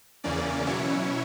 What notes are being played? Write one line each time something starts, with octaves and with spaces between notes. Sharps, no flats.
E2 C#3 E3 A#3 C#4 D5
B2 F#3 C#4 E4 C#5